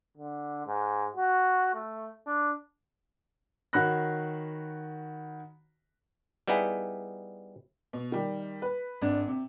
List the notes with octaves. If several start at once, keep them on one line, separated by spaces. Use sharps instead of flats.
D3
G#2
F#4
A3
D4
D#3 F#4 C#5 B5 F#6 A#6
G3 B3 D#4 E4 G#4
B2
D#3 G3
B4
G#1 D4
C3